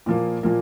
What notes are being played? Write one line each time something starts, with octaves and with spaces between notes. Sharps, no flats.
A#2 F3 A#3
A#2 F3 A#3